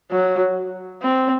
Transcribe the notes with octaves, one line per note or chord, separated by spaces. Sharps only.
F#3
C4